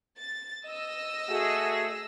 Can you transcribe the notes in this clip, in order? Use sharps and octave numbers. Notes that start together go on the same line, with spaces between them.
A6
D#5 E6 A#6
A3 F#4 G#4